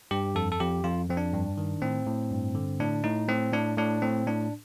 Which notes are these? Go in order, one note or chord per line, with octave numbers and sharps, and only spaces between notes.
G2 G4
F2 A4
A4
F2 G4
F2 F4
F2 C4
D4
G2
D#3
A2 C4
A2
G2
D3
A2 D4
A2 D#4
A2 C4
A2 D4
A2 D4
A2 C4
A2 D4